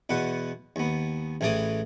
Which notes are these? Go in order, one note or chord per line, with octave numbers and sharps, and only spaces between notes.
E2 B2 B4 F#5
D#2 B3
A1 A2 E3 G#4 D5 D#6